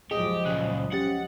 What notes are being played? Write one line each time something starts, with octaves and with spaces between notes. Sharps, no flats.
C#2 F3 F#3 G4 G#4 D#5
A#2 C#3 F#6
C#4 G4 F#5 A6